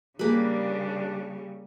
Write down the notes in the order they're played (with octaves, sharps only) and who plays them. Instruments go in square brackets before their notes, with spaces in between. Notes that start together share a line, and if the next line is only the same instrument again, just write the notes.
[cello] C#3 G3 [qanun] A#3 B4 [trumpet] D4 [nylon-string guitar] G4 G#4